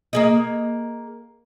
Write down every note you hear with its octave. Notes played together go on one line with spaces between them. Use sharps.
A#3 G#4 D#5